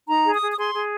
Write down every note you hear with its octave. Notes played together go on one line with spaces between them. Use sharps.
D#4 A#5
G#4
D#6
G#4
D#6
G#4 C6
G#4